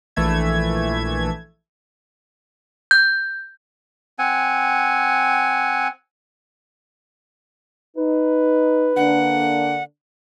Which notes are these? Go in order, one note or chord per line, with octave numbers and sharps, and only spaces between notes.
A#1 E3 A3 E5 G#6
G6
C4 F#5 G#5
D#4 B4
D3 A#3 D4 F#5